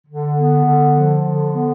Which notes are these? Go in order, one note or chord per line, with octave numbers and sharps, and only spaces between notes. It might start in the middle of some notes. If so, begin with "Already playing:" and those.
D3
B3
D3
F3
D3
B3